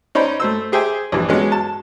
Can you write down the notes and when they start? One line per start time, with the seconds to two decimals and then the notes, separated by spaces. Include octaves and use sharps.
0.15 C#4 D#4 C5 D5 B5
0.40 A3 C5 E6
0.72 G4 G#4 C5 E5 G5 G#5
1.12 A#1 E3 G3
1.29 G2 F#3 G#3 B3 C#4
1.52 A5